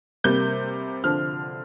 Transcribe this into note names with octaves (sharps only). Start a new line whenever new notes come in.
C3 G3 A#3 G6
D3 F3 C4 F6